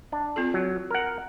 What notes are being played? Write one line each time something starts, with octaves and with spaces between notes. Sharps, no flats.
D4
C4 F4 A4
F#3
A#4 F#5